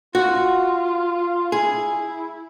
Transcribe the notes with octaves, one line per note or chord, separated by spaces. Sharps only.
F4 F#4
E4 G#4